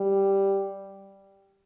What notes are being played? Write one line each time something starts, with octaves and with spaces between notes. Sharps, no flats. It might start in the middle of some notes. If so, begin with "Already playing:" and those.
Already playing: G3